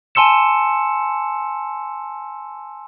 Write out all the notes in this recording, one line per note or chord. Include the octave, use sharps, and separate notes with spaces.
G#5 A5 C6 E6 C#7 E7